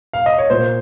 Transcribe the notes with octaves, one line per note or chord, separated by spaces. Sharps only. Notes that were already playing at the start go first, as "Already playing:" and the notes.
F5
D#5
C#5
A#2 C5